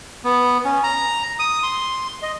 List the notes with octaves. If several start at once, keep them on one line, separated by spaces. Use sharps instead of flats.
B3
C#4
A#5
D#6
C6
D#5